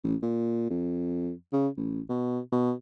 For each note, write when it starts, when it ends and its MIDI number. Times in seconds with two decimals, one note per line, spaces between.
0.04 0.16 33
0.23 0.66 46
0.71 1.32 41
1.53 1.68 49
1.77 2.01 33
2.09 2.40 47
2.52 2.73 47